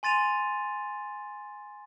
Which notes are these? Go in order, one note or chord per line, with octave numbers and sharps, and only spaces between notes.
G#5 C6 A6 D#7 F7